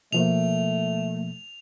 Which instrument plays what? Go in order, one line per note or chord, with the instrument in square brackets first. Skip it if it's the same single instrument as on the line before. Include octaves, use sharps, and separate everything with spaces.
[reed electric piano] B2 F3 A#3 [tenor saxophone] A3 [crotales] F7